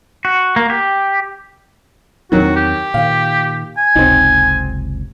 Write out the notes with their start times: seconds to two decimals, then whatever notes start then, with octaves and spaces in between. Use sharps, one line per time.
0.25 F#4
0.56 A#3
0.70 G4
2.32 E2 D#3 F#3 C4 F#4
2.56 G4
2.94 A#2 D#3 F5
3.77 G#5
3.95 F#1 C#2 C3 C4 D#4